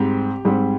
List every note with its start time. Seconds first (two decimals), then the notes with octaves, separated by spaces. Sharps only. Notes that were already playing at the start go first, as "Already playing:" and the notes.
Already playing: G#2 G3 C4 G4
0.45 G#2 G3 C4